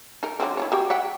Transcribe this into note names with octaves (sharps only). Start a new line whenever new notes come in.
D#4 A#4
D3 F#3 C4
E4 F4 C#5
F#3 G4 G5
E5 F#5 G5